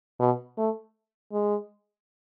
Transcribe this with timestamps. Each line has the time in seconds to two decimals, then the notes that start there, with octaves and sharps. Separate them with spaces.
0.20 B2
0.58 A3
1.33 G#3